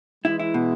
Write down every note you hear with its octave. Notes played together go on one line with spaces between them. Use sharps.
E3 G#3 E4
E4
B2